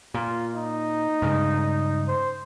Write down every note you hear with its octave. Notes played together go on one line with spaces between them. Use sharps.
A#2 F4
D#4
G2 C#3 G#3
C5